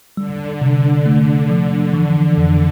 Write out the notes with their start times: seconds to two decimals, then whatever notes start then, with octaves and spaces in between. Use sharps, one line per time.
0.17 D3 G3
0.61 C3
1.06 A3
1.49 F3
1.93 E3
2.37 F2